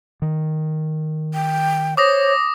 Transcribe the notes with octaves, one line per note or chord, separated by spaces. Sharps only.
D#3
G5
C5 C#5 D6 D#6 A#6